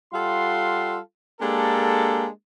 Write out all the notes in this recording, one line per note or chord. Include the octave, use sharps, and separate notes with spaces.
G3 F4 A4 F5 F#5 C6
G#3 A#3 D4 G4 A4